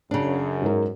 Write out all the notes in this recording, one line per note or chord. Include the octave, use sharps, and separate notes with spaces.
F#2 C#3 D4
G#2 A#4